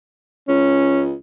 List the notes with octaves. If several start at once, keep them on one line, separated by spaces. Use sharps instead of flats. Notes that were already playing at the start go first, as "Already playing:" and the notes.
C#2 C#4